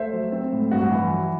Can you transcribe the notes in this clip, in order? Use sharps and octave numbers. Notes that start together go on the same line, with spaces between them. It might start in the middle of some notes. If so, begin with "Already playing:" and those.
Already playing: A3 C5 E5
F#3
C4
A2
G2 F#4
E3
F#3